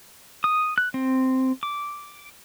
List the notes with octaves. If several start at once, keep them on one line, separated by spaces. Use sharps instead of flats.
D#6
F#6
C4
D6